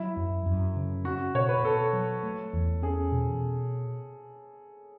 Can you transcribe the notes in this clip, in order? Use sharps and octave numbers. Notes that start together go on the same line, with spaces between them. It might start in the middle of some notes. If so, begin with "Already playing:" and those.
Already playing: F#3 E4
F#2
F#2
C#3
C#4 F#4
B2 C#5
B4
B2 A4
F#3
A3
E2
C#4 G#4
B2